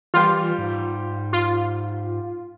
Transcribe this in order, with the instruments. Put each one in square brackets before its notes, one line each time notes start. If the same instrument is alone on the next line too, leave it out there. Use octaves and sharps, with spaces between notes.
[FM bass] E3 [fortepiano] G3 C6 F6 [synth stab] F4
[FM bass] G#2
[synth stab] F4